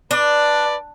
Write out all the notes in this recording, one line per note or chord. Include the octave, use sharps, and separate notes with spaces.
D4 B4 D5